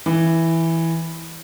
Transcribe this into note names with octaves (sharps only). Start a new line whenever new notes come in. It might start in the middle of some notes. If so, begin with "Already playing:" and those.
E3